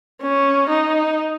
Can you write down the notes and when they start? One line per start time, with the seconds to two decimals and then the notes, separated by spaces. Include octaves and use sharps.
0.22 C#4
0.70 D#4